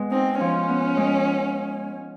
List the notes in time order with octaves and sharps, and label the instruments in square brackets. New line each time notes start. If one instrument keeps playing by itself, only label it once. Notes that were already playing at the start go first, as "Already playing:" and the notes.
Already playing: [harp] G#3 B3
[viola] C4 [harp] D#4
[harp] F3 [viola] C#4
[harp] B3
G#3